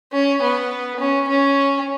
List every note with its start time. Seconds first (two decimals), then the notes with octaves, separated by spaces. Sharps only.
0.12 C#4
0.41 B3
0.99 C#4
1.28 C#4